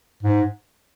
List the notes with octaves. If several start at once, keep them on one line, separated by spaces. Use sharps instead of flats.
G#2